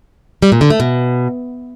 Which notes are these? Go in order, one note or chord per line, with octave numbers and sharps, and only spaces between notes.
G3
A#2
D3
A3
B2